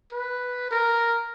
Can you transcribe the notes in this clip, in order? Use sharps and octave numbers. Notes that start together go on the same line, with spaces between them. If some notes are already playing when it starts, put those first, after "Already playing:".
B4
A#4